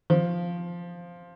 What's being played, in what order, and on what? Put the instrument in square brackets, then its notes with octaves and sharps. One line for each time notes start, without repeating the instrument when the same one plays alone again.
[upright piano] F3